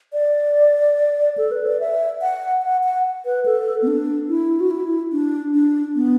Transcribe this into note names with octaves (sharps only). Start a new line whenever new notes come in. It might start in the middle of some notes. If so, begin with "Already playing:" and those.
D5
A4
B4
D5
E5
F#5
F#5
F#5
B4
A4
B3
D4
E4
F#4
E4
D4
D4
B3